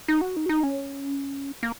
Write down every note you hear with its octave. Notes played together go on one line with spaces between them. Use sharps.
D#4
F#4
D#4
F#4
D#4
C#4
A#3